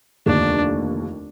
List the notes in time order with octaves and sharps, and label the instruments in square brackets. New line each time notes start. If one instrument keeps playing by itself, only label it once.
[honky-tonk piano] F1 D#2 D3 [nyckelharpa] D4